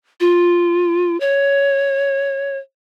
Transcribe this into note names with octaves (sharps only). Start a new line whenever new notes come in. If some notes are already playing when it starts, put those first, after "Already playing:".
F4
C#5